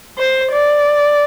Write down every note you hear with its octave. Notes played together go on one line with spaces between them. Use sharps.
C5
D5